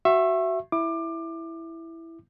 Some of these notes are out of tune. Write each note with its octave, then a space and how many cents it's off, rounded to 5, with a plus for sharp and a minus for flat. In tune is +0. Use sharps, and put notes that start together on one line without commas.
F#4 +15 E5 +15 C#6 -35
E4 +0 D6 +25